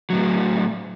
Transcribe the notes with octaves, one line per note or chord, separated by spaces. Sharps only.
A2 F#3